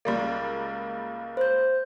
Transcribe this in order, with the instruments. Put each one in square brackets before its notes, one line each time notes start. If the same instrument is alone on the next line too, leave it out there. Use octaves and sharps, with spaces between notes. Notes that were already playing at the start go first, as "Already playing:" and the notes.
[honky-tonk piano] C#2 G3 A#3
[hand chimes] C5 G6